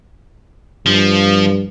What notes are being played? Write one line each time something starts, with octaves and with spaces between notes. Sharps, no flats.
G2 F3